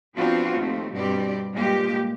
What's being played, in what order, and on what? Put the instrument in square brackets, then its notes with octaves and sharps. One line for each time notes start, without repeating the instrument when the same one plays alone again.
[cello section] F3 B3 C4 D4 F4 F#4
D#2 F3 A3 C4
G2 B2 G3 C4 G4 D5
G2 A#2 G#3 A#3 G4